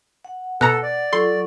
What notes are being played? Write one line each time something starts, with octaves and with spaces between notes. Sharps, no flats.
F#5
B2 A4 A#5 F#6 A#6 C#7
D5
F#3 F4 A4 C6 C#6